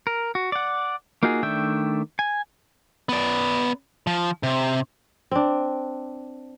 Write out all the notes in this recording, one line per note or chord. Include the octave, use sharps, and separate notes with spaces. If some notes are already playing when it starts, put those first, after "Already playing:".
A#4
F#4
D5 F#5
A#3 D#4 F4 F#4 G#4
D#3 A3 D4 E5 G5
G#5
B3 D5
F3
C3
C4 D4